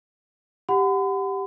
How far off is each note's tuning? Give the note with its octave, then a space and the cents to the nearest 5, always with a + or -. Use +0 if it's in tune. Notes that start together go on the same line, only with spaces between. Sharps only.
G4 +0 F#5 +0 B5 +45